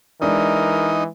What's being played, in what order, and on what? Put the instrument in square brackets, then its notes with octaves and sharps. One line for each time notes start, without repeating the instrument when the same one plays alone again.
[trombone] E3 [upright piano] G#3 D4 [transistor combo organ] D#4 [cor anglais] A#4